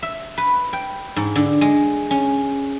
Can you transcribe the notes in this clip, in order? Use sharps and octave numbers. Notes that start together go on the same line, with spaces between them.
E5
B4
G5
G#2
D3
G#3
C#4